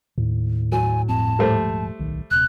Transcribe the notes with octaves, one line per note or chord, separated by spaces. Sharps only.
D#2 A2
F#3 G#5
G1 F2 C4 A5
D#1 G#2 F3 G3 A3 C5
D1 B1 D#3
D#1 C3 F#6